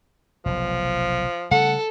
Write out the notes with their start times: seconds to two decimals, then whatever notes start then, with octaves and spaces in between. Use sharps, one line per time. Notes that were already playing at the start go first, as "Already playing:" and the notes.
0.46 F1 B1 F3
1.51 C#3 G3 A3 A4 F#5